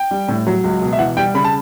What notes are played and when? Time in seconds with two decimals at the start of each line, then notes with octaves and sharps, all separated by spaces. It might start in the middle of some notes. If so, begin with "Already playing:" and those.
Already playing: G5
0.11 G3
0.28 A2
0.47 F#3
0.64 C#2
0.81 B2
0.92 E5
0.99 E3 F#5
1.17 G3 G5
1.34 C#3 B5
1.44 A5